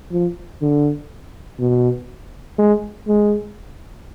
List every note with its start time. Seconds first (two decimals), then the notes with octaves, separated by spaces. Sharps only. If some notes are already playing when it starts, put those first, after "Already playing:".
0.11 F3
0.62 D3
1.60 B2
2.58 G#3
3.08 G#3